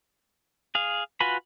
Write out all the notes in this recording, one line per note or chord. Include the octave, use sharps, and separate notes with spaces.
G#4 F5
F4 F#4 B4 G#5 B5